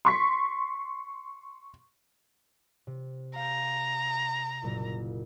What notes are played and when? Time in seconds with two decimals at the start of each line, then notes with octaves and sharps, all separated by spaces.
0.05 C6 C#6 B6
2.87 C3
3.36 F5 A#5 G6
4.62 F#1 A#2 E4